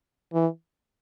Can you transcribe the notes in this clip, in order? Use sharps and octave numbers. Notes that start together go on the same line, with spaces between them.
E3